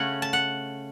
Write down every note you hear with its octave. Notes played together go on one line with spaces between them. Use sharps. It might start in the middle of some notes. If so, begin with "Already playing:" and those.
Already playing: C#3 A3 C#4 F#5
A5
F#5